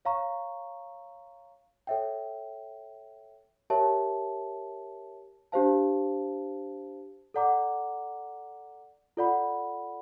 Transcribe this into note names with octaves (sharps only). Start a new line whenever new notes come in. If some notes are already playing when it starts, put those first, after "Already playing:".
C#5 F5 A#5 C#6
A4 C#5 E5 G5
G4 A#4 C#5 E5 A5
D4 G4 C5 F5 A5
A4 D5 F#5 A#5 D6
F4 A4 D5 F#5 B5